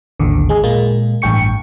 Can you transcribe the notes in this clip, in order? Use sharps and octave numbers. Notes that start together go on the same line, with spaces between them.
A1 D#2 D3
G#3 G#4
A#2 G#3 A#3
A1 G2 G5 C#6 C#7